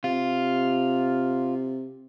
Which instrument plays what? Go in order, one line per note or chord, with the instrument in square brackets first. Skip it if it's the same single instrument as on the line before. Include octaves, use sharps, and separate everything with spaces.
[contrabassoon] C3 [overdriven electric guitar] F4